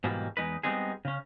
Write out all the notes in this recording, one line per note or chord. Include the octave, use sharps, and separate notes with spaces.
G#2 B2 E3 G3 A#3
E2 G#3 D#4 B4
G3 G#3 B3 C4 D#4 G#4
C#3 C#4